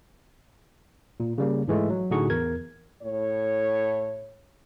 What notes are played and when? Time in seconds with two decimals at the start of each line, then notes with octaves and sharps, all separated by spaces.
1.20 A#2
1.38 C#3 G3 A#3
1.68 G#2 E3 G#3 A3
1.90 F#3
2.11 A2 D3 D#4 F#4 G#4 C#6
2.30 E2 A#4 G#6
3.02 A2 C#5